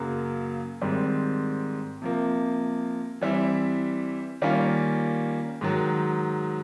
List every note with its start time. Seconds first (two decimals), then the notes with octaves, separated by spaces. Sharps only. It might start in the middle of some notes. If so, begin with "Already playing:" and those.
Already playing: F#2 C#3 F#3 A#3
0.81 G#2 D#3 G3 C4
2.02 C3 F3 A#3
3.21 E3 G3 C4 E4
4.42 D#3 G3 A#3 C#4 F4
5.61 G#2 D#3 F#3